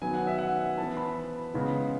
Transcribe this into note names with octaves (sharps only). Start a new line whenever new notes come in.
D#3 F#3 B3 G#5
F#5
E5
F#5
E3 B3 A5
B5
C#3 E3 G#3 B3